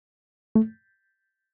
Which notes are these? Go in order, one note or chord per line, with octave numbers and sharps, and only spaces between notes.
A3